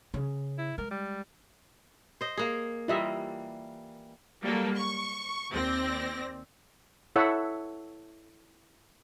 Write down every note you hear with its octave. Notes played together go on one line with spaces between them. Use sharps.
C#3
E4
G#3 A#4
G3
C5 D#5
A#3 G#4
E3 G3 A#3 F4 D#5 E5
F#3 G3 A#3 A4
C#6
D#2 C4 D5 A#6
E4 A4 C#5 E5 F#5 E6